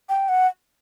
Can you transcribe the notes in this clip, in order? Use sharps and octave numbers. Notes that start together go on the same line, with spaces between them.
G5
F#5